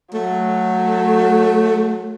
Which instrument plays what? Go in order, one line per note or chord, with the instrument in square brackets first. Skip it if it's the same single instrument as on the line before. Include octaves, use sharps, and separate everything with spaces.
[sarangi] F#3 [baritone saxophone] A3